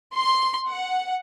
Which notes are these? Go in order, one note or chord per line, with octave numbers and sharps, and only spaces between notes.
C6
F#5